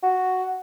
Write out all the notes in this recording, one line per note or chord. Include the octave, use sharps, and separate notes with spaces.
F#4